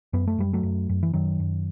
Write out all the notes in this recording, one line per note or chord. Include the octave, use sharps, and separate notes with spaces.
F#2 B3
A3
F#2 G3
F#3 A3
F#2
F#2
E3
F#2 D#3 F#3
F#2